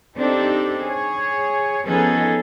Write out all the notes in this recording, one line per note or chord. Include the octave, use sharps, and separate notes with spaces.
C4 D4 D#4 G4 A4
G#4 C#5
F3 B3 C#4 D#4 G#4 A4